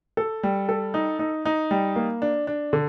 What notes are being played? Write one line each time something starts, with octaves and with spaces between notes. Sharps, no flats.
A4
G3
A4
D#4
D#4
D#4
G3
A#3
D4
D4
D3